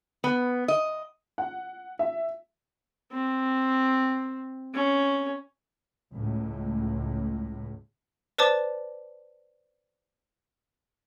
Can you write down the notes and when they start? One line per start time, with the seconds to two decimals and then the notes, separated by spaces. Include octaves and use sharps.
0.24 B3
0.68 D#5
1.38 F#5
1.99 E5
3.13 C4
4.74 C#4
6.12 C#2 A2
8.38 B4 C5 D5 A5 D6